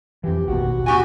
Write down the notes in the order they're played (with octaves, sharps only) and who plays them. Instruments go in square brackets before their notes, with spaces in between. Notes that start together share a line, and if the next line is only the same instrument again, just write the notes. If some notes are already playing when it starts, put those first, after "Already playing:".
[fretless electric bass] F2 E3 [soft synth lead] G4
[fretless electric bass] A1 D#2 B2 [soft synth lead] F#4
[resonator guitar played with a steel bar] B3 G4 G#5 [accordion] F#4